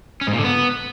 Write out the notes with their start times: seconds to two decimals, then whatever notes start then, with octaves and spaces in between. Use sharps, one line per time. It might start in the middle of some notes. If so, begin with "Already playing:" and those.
0.21 C#4
0.27 G#2
0.33 A#2
0.38 D3
0.44 B3